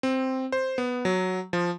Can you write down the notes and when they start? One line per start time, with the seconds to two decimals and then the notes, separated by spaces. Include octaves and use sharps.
0.03 C4
0.52 C5
0.78 B3
1.05 F#3
1.53 F3